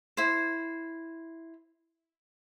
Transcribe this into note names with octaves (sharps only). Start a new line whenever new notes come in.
E4 C5